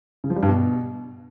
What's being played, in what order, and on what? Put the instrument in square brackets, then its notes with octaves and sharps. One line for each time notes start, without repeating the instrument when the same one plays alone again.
[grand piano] C#3
F3
G3
G2
B2